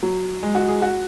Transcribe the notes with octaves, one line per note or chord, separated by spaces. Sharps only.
F#3
G#3
F#4
G#4
F#4